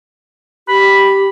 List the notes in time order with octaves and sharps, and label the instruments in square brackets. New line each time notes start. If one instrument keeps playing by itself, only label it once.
[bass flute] G4 [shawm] B5